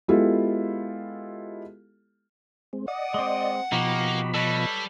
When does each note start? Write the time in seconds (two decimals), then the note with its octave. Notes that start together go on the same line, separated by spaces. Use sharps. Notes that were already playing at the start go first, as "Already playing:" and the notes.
0.08 G#3 B3 E4 F4 G4 A4
2.73 G#3 C4
2.88 D5 D#5 F#5
3.14 G#3 C4
3.72 B2 F3 A#3 D#4 F#4 G4 B5
4.34 G3 A4 B4 C#5 D#5